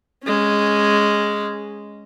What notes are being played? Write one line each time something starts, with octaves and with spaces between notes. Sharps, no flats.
G#3 C#4